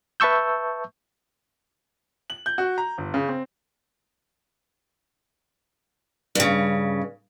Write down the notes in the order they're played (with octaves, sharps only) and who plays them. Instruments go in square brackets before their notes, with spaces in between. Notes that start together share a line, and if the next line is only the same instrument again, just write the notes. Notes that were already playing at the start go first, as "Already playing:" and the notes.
[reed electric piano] B4 E5 A5 C#6 E6 G6
[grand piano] F#7
G6
F#4
A#5
G1
C#3
C4
[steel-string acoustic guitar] G2 C#3